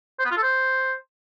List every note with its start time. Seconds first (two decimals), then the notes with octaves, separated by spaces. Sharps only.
0.19 C5
0.25 B3
0.31 F4
0.37 A4
0.43 C5